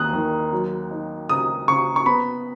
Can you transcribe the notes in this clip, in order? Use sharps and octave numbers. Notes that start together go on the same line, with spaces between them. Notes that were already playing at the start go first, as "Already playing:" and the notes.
Already playing: D#2 D#6 F#6
D#3
F#3
D#4
C#2 D#6
C#3 C#6
C#6
B3 B5